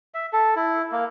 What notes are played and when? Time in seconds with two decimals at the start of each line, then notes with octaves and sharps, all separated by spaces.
0.14 E5
0.33 A4
0.56 E4
0.92 A#3